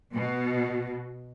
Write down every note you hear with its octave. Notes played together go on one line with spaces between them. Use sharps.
B2